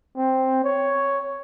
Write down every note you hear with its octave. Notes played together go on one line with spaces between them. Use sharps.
C4
C#5